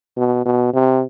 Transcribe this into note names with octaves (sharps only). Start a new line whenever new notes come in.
B2
B2
C3